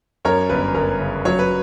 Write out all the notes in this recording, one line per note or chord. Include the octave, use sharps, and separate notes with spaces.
F#2 A#4 C#5
G1 B4
G1 A#4
C#3
F#3 C#5
B4